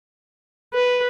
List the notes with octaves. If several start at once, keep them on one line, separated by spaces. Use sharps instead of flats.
B4